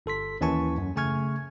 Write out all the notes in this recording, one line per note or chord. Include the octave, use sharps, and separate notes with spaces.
G1 A4 C6 B6
D#2 E3 C#4 G#5 A5 C#6
F#2
C#3 A3 G#5 C#6 F6 G#6